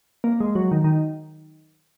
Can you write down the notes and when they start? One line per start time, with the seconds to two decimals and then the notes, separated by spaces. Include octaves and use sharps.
0.24 A#3
0.40 G#3
0.55 F#3
0.71 D#3
0.84 D#3